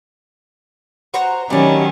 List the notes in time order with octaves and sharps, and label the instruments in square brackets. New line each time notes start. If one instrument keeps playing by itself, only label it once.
[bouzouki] F#4 C5 A#5
[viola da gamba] D#3 F#3 C#4 [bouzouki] G3 A3